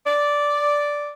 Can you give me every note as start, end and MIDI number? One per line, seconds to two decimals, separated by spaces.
0.05 1.11 74